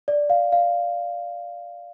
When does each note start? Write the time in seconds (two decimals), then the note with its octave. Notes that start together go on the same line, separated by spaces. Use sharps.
0.08 D5
0.30 F5
0.52 F5